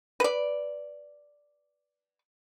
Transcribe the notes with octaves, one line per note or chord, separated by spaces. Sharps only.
B4 D5